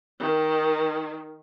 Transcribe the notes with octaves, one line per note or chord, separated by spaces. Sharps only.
D#3